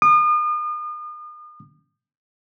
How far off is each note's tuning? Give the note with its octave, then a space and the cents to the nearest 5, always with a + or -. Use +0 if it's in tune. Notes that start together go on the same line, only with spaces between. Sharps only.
D#6 -40